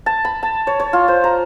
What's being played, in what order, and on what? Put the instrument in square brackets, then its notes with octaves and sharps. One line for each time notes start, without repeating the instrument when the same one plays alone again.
[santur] A5
B5
A5
C#5
C#5
F4
C5
A#5